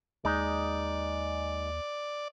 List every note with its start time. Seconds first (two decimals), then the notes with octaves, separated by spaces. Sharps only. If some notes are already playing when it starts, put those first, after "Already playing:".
0.25 D#2 G#3 D#4 D5